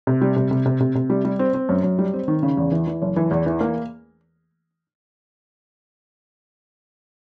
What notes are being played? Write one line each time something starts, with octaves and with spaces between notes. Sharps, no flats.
C3
G3
C3
C3
C3
C3
C3
G3
G3
C4
C4
F#2
F#2
G3
C4
D#3
C#3
E2
E3
E3
F#1
E3
E2
E3
A#3